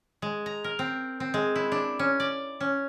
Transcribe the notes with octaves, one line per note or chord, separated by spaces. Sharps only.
G#3
A#5
A#4
C4
C4
G#3
E4
D4
C#4
D5
C#4